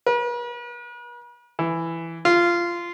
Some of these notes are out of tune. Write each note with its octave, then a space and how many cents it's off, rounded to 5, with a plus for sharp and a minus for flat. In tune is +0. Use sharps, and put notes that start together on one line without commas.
B4 -45
E3 +10
F4 -15